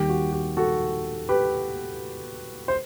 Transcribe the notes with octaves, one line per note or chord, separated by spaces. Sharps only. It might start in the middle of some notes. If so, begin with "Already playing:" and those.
Already playing: D#2 D#3 G3 G4
F#4
G4
F#4 A4
G4 B4
C5